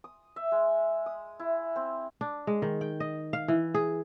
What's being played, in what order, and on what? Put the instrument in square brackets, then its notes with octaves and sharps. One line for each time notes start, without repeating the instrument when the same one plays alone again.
[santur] D#6
E5
G#3
D#6
E4
C4
[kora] D4
G#3
D#3
G5
D#5
F5
E3
G#4